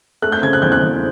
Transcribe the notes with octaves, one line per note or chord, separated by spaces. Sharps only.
A3 F#6
G6
C#3 G#6
F#6
E2 G6
F#6
E2